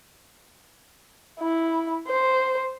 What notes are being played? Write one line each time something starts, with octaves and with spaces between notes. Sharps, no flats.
E4
C5